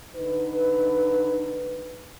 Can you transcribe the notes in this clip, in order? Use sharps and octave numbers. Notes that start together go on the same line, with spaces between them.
D3 D#4 B4